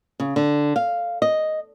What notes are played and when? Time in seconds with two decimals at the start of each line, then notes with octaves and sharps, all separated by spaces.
0.20 C#3
0.36 D3
0.76 F5
1.22 D#5